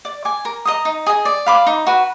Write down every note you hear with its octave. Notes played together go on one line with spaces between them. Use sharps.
D5
G#5 D6
A#4
D#5 A#5 D#6
D#4
G#4 D#5 G#5
D5
F5 B5 D6
D#4
F#4 B4